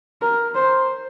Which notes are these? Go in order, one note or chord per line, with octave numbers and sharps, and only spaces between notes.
A#4
C5